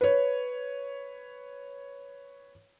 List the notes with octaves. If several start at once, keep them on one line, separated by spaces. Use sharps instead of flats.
B4 C#5